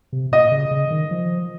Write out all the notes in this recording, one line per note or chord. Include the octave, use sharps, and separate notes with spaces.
C3
A#2 D#5
C#3
C#3
D#3
F3